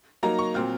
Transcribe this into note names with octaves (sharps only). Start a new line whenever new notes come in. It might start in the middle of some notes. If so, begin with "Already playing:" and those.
F#3 A#3 D#4 A#5
C#6
A#2 F#3 C4 F4 F6